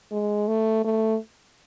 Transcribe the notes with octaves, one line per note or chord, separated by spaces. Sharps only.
G#3
A3
A3